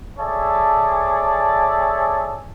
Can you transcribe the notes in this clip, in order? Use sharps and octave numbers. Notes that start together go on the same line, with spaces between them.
G#4 A4 C#5 D5 E5 A5